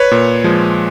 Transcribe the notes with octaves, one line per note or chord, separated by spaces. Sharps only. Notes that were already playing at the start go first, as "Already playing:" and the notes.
Already playing: B4 C#5
A#2
F3 G#3